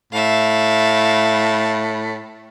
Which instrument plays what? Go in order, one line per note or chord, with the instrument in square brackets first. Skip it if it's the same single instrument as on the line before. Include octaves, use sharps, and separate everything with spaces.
[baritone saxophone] A2 [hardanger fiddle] E5 F5